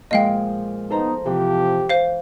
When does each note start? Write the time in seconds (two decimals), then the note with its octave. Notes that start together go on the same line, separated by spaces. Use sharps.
0.11 A#2 F3 G#3 D#5 F5 G5
0.90 B3 D#4 A4 C5 A#5
1.26 C3 E3 F3 G4
1.89 C5 F5